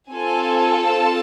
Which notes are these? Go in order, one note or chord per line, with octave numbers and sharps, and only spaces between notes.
C4 F4 A4 G#5
A5